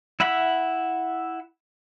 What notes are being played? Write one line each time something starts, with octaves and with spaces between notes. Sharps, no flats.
E4 E5 F#5 B5